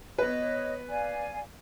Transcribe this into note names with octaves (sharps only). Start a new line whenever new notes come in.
B3 B4 C#5 D#5
D5 F5 G#5